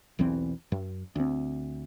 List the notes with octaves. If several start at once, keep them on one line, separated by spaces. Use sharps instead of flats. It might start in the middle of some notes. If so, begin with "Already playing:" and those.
B1 E2 E3 C4
F#2
D2 C4